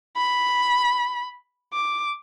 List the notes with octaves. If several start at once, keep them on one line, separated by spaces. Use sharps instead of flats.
B5
D6